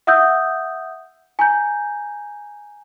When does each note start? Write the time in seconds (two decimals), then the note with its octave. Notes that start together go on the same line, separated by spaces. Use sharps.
0.07 E5 F#5 D#6 E6 G6
1.39 G#5 A#5 G6